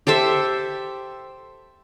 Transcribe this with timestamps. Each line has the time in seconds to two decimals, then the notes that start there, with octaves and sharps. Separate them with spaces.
0.07 G4 A4 C5 E5